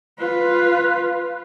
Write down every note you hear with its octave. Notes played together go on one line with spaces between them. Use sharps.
F4 B4